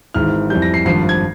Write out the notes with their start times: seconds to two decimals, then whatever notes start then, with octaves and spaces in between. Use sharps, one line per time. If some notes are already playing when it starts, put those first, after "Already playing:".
0.14 G#1 G#2 E3 F6
0.50 F2 E3 G3 G6
0.62 A#6
0.74 C7
0.85 G#1 G2 F3 C7
1.09 G#6